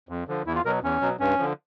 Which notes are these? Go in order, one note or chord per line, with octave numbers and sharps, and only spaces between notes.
F2
D3 F3
E2 E4
F4
B2 F#3 A#4
E2 C#4
B2 F#3
G2 C#4
D3 F3